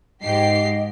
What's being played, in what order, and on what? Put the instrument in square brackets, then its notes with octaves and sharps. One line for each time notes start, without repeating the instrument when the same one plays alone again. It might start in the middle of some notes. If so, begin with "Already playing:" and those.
[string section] G#2 G4 C7 [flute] D#5